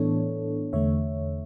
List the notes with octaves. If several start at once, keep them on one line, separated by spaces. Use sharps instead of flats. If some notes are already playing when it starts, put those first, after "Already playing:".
Already playing: A2 E3 B3 D4 A4 C#5
E2 D3 A3 C#5 E5